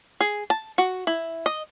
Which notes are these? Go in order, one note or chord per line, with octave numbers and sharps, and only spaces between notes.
G#4
A5
F#4
E4
D#5